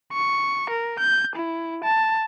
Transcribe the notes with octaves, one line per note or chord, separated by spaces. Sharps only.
C#6
A#4
G6
E4
A5